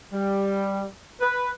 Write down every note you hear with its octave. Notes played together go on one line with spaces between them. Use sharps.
G3
B4